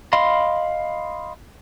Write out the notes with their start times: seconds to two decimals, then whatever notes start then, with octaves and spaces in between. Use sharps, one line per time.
0.13 D#5 F5 B5 C6